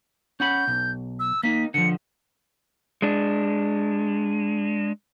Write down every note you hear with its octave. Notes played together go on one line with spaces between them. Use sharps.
C#4 F#5 B5 G6
B1
E6
A#3 D#4 B6
D3 F3 C#7
G#3 D4